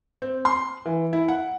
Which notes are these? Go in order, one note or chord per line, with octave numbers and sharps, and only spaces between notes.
C4
C6
E3
E4
F#5